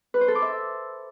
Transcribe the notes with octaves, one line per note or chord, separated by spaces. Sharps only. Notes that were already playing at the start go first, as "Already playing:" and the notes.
B4
C5
A4
D6
E5